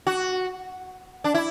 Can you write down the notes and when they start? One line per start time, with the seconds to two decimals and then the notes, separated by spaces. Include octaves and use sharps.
0.07 F#4
1.24 D4
1.34 E4